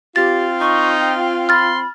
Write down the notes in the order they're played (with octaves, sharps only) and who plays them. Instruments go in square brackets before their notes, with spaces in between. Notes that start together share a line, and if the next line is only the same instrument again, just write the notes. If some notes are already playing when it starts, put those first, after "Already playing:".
[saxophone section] C4 F4 [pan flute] G4 [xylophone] A6
[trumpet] D#4 [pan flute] C#6
[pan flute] G5
[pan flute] B5 [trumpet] C6 [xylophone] F6 A6